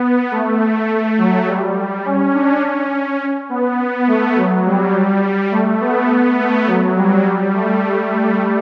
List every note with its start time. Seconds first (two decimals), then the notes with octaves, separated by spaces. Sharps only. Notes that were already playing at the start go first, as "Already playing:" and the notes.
Already playing: B3
0.31 A3
0.89 A3
1.18 F#3
1.48 G3
2.05 C#4
2.34 D4
2.62 C#4
3.49 B3
4.08 A3
4.37 F#3
4.66 G3
5.52 A3
5.81 B3
6.39 A3
6.67 F#3
6.96 G3
7.54 A3